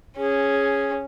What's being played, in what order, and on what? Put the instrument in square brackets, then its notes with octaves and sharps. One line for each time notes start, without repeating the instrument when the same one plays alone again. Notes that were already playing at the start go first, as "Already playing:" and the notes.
[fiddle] C#4 [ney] G#4